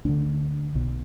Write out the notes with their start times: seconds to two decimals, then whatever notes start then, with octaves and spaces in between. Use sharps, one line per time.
0.05 D2 D3 D4
0.75 B1 B2